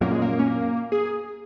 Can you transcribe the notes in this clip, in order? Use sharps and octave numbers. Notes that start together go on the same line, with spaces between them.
F#2 A#2 A#3
G#3
A#3
C#4
A#3
G#4